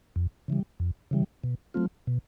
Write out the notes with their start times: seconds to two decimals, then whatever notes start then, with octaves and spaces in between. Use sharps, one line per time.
0.16 F2
0.48 C#3 E3 G3
0.80 F2
1.11 C#3 E3 G3
1.44 B2
1.74 F#3 A3 C4 F4
2.07 B2